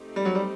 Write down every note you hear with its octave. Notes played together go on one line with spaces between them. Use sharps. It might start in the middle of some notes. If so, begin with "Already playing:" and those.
Already playing: A3 C4 D#4 G4
G3
F#3
G3